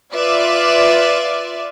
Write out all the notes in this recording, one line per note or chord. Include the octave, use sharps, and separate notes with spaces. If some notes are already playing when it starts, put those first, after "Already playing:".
F4 B4 D5 E5